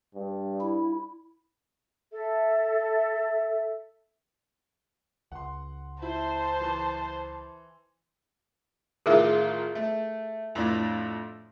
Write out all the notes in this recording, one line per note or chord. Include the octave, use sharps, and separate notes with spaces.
G2
E4
A4 E5
C#2 F#5 C6
E4 C5 A5
E3 C6
A1 D#3 F4 G#4 A#4 E5
A3
F2 A2 D4